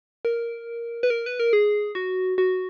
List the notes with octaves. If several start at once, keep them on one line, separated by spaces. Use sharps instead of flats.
A#4
B4
A#4
B4
A#4
G#4
F#4
F#4